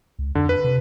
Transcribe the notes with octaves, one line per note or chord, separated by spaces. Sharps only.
C#2
F2 D3
B4
C3